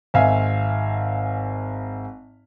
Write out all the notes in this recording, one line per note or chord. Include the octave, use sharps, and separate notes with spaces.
G#1 E5 F5 G#5